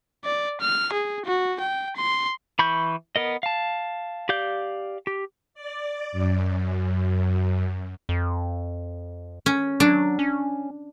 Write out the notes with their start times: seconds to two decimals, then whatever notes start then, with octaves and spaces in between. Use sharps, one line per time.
0.24 D5
0.61 F6
0.93 G#4
1.25 F#4
1.60 G5
1.96 C6
2.59 E3 B5 C#6 G6
3.16 B3 A#4 D#5
3.43 F5 A5
4.29 G4 D5 F5 G6
5.07 G4
5.54 D5
6.12 F#2
8.09 F2
9.46 C#4
9.80 F#3 D4
10.19 C#4